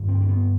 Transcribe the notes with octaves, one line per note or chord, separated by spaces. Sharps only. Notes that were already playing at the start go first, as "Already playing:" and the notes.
Already playing: G2 D3
C4
C4
B3